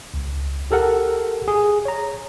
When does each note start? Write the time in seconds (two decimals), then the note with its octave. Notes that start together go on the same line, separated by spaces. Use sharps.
0.14 C#2
0.71 G4 A4 A#4 F#5
1.48 G#4
1.85 C#5 A#5